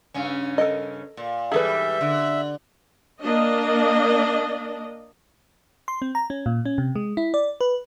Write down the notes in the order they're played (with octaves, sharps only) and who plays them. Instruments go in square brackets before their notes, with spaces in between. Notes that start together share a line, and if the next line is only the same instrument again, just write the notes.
[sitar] G2 C#3 C#4
[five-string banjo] A4 A#4 D#5
[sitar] A#2
[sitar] G#2 E3 G3 [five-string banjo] G#4 A4 B4 [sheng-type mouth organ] E5
[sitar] D3
[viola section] A#3 D4 D#5
[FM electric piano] C6
C4
A#5
C#4
A#2
C#4
C3
G#3
E4
D5
B4